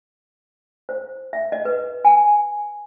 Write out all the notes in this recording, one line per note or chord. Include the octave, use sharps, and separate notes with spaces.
C5
E5
D#5
B4
G#5